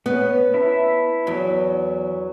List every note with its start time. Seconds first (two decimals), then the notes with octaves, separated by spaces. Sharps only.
0.06 B3 C#4
0.54 E4 E5 A5
1.27 E2 F#3